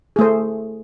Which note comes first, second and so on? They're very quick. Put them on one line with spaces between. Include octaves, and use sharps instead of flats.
G#4 A3 C5